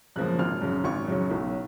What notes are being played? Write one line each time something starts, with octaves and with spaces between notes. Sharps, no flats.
F#2 C#3 F3 A#3 F#6
G#1 F6
F#2 C#3 F#3
G#1 C#6
F#2 C#3 F#3
B1